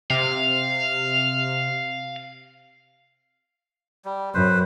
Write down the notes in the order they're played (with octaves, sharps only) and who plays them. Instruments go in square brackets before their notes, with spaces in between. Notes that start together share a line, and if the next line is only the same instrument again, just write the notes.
[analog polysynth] C3 [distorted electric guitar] F5
[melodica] G3
[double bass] F#2 [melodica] B4 C5